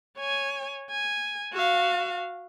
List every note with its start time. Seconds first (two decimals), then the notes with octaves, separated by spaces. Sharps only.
0.18 C#5 G#5
0.91 G#5
1.53 F#4 F5